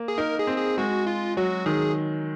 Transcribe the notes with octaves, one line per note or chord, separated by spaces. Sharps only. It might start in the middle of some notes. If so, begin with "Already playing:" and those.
Already playing: A#3
G#4
D#4 A#4
G#4
C4
G#4
G#3 F#4
F4
F#3 F#4
D#3 G#4